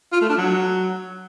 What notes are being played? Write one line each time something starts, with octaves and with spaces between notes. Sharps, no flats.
F4
A3
D4
F#3